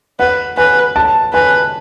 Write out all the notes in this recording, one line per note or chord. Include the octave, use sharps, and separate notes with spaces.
B4 F#5
B4 G#5
A5
B4 G#5